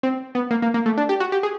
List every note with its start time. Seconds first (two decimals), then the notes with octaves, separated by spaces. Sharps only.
0.03 C4
0.35 B3
0.51 A#3
0.62 A#3
0.74 A#3
0.86 A3
0.98 D4
1.09 G4
1.20 F#4
1.32 G4
1.43 G#4